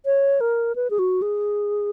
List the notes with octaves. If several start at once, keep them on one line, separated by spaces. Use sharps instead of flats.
C#5
A#4
B4
G#4
F#4
G#4